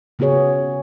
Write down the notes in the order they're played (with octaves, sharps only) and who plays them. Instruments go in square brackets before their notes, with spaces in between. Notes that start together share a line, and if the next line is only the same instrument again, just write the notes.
[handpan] C#3 B3 F#4 G#4 C#5